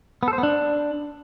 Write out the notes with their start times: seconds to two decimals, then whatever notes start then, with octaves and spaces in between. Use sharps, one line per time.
0.23 B3
0.28 A4
0.33 C5
0.38 B3
0.43 D4